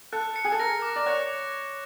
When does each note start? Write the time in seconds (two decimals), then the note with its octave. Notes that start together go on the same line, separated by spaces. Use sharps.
0.13 A4 F#6
0.36 C#7
0.45 G#4
0.52 A4
0.59 A#4 A#6
0.82 D6
0.96 D5
1.06 C#5 F#6